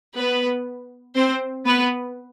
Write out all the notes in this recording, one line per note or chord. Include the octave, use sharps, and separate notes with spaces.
B3 B4
C4 C5
B3 B4